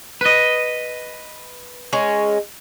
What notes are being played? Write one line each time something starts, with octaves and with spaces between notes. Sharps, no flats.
B4 D#5
G#3 C#4